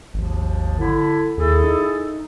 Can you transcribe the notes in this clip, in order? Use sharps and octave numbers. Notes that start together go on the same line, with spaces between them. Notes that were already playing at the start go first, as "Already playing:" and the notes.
G#1 D#2 F3
D3 E4
D#2 E4 G#4 A4
D#4